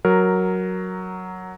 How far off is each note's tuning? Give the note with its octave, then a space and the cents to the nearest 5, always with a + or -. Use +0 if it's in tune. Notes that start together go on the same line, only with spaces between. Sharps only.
F#3 +0 A#4 +0